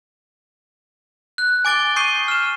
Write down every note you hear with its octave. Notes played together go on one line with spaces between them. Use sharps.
F#6
G#5 D6 A6 D7 G7
C#6 D#6 G6 C7 D#7 G7
F6 E7